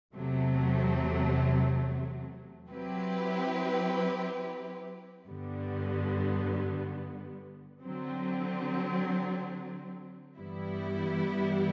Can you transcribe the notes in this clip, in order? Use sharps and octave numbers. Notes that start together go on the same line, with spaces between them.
E2 C3 F#3 A3
F#3 C4 E4 G4 B4
G2 D3 G3 B3
D3 F#3 C4
G2 E3 G3 B3 E4